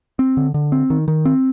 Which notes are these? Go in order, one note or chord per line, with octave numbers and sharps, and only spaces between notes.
C4
D3
D3
C4
D#3
D#3
C4